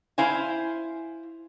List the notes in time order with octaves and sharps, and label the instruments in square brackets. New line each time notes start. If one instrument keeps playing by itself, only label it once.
[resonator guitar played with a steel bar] E4 C5 F5 G#5